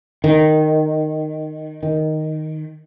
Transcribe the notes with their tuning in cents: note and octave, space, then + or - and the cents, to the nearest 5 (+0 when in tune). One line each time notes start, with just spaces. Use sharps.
D#3 -10
D#3 +0